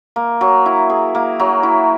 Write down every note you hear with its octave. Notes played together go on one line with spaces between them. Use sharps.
A#3
F#3
E4
G#4
A#3
F#3
E4